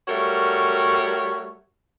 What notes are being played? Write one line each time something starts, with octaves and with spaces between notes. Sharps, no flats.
G3 A3 F#4 A#4 C#5